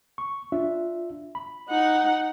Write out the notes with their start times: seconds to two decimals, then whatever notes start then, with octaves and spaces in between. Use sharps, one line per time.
0.18 C#6
0.52 D4 F4 E5
1.35 B5
1.69 D#4 F#5